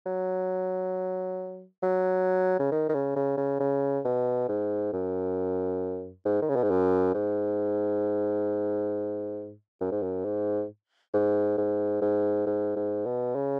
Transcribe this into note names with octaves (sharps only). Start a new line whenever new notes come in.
F#3
F#3
C#3
D#3
D#3
C#3
C#3
C#3
C#3
B2
G#2
F#2
G#2
D#3
C#3
B2
G#2
F#2
G#2
F#2
G#2
F#2
G#2
G#2
G#2
G#2
G#2
G#2
B2
C#3